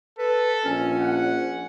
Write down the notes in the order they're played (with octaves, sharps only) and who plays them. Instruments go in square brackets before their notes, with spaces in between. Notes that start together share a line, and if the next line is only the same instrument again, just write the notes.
[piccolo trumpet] A4 [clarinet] B4
[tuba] A#1 [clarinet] C#4
[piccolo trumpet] F#5